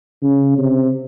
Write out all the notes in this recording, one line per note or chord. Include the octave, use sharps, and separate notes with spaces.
C#3
C3